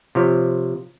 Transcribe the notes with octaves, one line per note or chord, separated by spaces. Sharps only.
C3 F3 C#5